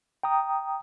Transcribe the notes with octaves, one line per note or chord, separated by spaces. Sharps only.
G5 A#5 D#6